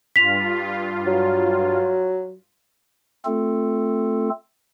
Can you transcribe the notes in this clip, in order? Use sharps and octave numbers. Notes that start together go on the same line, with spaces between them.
G2 F4 B6 F7
F#3
A3 C4 F4 A4